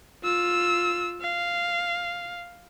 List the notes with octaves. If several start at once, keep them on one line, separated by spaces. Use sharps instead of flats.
F4 E6
F5